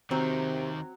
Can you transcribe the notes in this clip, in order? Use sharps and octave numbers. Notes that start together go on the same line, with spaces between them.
D#2 C3 D#3 F#3 C4